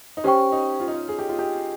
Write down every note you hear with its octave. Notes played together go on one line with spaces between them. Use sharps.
D#4
C#4 G4 C5 G5 C#6
D#4
F4
D#4
F4
G#4
G4
F4
G4